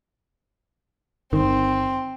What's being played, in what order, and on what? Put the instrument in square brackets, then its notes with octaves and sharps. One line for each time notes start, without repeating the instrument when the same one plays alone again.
[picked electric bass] G1 D#3 [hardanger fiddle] C4